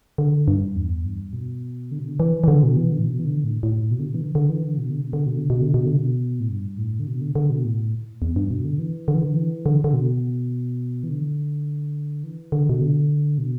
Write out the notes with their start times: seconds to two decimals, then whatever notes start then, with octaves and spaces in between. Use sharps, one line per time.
0.18 D3
0.48 G2
0.76 E2
1.05 G2
1.33 B2
1.92 D3
1.99 B2
2.08 D3
2.20 E3
2.44 E3
2.48 D3
2.63 B2
2.77 E3
2.92 D3
2.99 A2
3.05 B2
3.19 E3
3.25 D3
3.44 A2
3.63 A2
3.91 B2
3.99 D3
4.07 B2
4.14 E3
4.21 D3
4.35 D3
4.50 E3
4.64 D3
4.78 B2
4.90 D3
5.02 B2
5.13 D3
5.26 B2
5.38 D3
5.50 B2
5.62 D3
5.74 B2
5.86 D3
5.98 B2
6.40 A2
6.50 G2
6.78 A2
7.00 D3
7.07 B2
7.21 D3
7.35 D3
7.50 B2
7.65 A2
8.22 E2
8.36 G2
8.51 B2
8.65 D3
8.79 E3
9.08 D3
9.15 E3
9.23 D3
9.36 E3
9.66 D3
9.84 D3
9.94 B2
11.04 E3
11.09 D3
12.24 E3
12.52 D3
12.69 B2
12.81 D3
13.38 B2